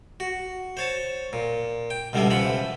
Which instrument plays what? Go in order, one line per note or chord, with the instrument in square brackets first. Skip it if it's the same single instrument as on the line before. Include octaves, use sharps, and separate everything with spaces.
[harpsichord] F#4
C5 C#5 A5
A#2
G5
C#2 B2 D3 G3 B3 E4
C#2 E3 F3 F#5 B5